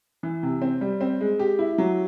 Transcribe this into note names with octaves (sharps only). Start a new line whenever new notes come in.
E3
C3
C4
G3
C4
G#3
G4
E4
F#3